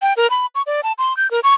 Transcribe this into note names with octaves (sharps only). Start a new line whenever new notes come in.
G5
A#4
B5
C#6
D5
A5
C6
G6
A#4
C#6